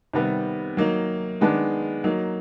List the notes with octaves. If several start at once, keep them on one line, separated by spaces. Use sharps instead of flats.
C3 D#3 G3 B3
F#3 A#3 D#4
D#3 G#3 B3 D4
F#3 A#3 D#4